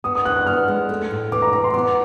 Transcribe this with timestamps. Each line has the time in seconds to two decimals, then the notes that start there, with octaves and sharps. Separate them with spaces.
0.04 B3 D#6
0.15 D#6
0.25 E3 F#6
0.37 F#6
0.46 B3 F6
0.68 G#3
0.89 A3
1.11 A2
1.32 E3 D6
1.42 A#5
1.53 E3 A#5
1.64 C6
1.74 B3 D6